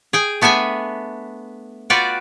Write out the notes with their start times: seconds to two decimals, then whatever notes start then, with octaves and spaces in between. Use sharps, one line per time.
0.13 G#4 G5 G#5
0.42 A3 B3 D4 E5 G#5
1.90 F4 F#4 B4 D5 G5